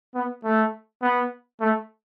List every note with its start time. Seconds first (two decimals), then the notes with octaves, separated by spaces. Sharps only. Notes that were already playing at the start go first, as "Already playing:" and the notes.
0.14 B3
0.44 A3
1.02 B3
1.60 A3